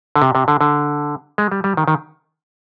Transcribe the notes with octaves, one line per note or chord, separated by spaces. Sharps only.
D3
C3
C3
D3
D3
G#3
G3
G3
D#3
D#3